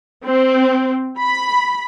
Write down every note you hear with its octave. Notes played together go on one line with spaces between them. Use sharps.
C4
B5